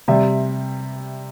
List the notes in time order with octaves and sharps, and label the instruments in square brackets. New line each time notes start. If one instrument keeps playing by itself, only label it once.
[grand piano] C3 G3 E5